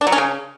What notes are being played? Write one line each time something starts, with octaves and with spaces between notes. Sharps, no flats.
D4
F#3
C#4
C#3